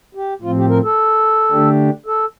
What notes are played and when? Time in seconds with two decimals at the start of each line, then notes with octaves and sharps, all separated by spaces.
0.15 G4
0.42 A2 F3 C4 F4
0.56 G4
0.69 A#4
0.83 A4
1.51 D3 A3 D4 G4
2.06 A4